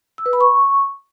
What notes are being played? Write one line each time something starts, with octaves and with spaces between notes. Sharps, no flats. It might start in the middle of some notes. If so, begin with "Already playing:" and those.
E6
B4
B5
C#6